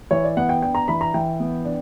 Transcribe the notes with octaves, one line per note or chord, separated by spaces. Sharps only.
E3 C#5
D5
B3 F#5
G5
D4 G5
A#5
E3 B5
A#5
E3 G5
B3
D4